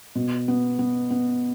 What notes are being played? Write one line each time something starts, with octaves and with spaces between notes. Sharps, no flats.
B2
B3
B3
B3